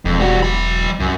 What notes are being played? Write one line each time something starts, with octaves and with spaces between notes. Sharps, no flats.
E1 F2
G3 F#4
F#3 B5
C2 F#2